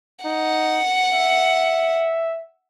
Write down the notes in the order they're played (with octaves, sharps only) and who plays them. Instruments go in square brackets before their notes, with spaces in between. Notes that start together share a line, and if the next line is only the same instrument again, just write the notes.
[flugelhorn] D#4 [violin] F#5
[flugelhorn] E5